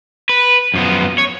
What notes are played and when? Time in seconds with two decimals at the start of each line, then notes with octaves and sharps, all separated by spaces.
0.29 B4
0.74 F#2 F3 B3
1.18 C#5